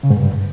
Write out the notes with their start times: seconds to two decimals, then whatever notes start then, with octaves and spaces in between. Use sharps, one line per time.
0.03 C#3
0.10 G#2
0.17 G2